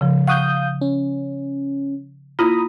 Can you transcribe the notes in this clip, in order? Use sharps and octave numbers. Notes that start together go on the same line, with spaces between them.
C#3 F3
F5 F#5 C#6 D#6 F#6 G6
C#4
A#3 E4 F4 A#5 B5 D#6